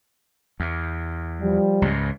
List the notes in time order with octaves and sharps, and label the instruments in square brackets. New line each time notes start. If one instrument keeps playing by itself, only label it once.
[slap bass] E2
[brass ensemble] F3 G3
[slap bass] C#2 G#2